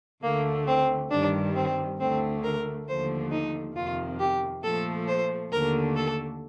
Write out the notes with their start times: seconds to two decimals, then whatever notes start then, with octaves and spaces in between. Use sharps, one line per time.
0.23 D2 D3 A3 A#3
0.67 C4
1.11 G2 D#3 G3 D4
1.55 C4
1.99 D2 D3 A3 C4
2.43 A#4
2.87 D#2 D3 F3 A3 C5
3.31 D#4
3.75 F2 C3 D#3 F4
4.20 G4
4.64 A#2 F3 A3 A4
5.08 C5
5.52 D#2 D3 A3 A#4
5.96 A4